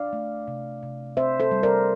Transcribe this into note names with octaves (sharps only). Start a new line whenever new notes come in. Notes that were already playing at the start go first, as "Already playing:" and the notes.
Already playing: D4 D5 F5
A3
C3
C3
C4 C5 E5
A4 C5
G3
A#4 D5